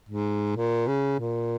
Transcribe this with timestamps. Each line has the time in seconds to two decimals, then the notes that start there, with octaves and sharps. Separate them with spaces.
0.09 G#2
0.56 A#2
0.87 C#3
1.19 A#2